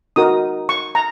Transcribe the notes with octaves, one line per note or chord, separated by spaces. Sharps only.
D#4 F#4 A#4 D#6
C#6
A#5